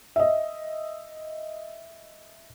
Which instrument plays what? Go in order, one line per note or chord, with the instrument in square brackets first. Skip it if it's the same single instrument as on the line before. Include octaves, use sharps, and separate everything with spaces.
[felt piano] D#5 E5